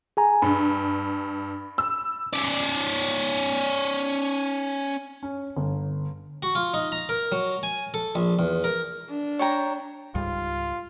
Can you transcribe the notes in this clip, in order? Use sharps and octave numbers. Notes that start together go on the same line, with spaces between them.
G#4 G#5 A#5
G2 B5
E6
C#4 D5
C#4
G1
F#4
F4
D#4
A#5
A#4
F#3
G#5
A4
A#1
E2
A#4
D4
C#5 G5 A#5
C#2 G#2 G3 F4